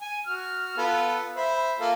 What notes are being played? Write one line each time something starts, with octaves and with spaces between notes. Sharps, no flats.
G#5
F#4 F6
B3 F4 A4
C5 E5 B5
A#3 F4 A4